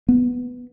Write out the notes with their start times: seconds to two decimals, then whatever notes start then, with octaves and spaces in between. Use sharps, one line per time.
0.09 B3